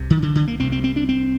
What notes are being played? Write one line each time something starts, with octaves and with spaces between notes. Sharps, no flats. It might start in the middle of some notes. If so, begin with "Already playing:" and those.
Already playing: C2 C3
D#3
D3
D3
A#3
C2 C3 C4
C4
C4
D4
C4